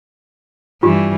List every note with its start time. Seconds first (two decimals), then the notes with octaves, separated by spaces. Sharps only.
0.83 G2 E3 F4 G4